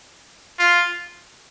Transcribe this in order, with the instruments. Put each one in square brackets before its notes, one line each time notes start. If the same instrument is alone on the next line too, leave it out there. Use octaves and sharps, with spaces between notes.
[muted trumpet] F4